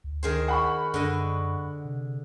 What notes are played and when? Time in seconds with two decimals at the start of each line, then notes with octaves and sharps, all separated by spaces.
0.04 D2
0.23 D#3 G#4 C5
0.48 F#5 B5 C#6
0.94 F#2 D3 D#5
1.85 C3